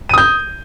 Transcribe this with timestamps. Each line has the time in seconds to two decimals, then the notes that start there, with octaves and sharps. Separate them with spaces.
0.09 D#7
0.14 D#6
0.18 G6